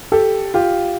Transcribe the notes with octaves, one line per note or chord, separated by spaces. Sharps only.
G4 A4
F4 G4